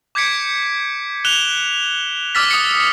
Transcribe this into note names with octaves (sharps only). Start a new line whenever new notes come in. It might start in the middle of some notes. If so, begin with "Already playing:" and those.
D6 G6 G#6 B6 C#7 D7
F#6 E7 F7 G7
D6 E6 F6 A6 B6
D#6 C#7